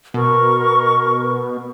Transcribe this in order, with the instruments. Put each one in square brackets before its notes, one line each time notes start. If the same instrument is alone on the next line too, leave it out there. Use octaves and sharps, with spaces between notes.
[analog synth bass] B2 [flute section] A#4 C#6